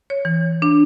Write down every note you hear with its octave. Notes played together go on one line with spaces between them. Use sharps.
C#5
E3
D4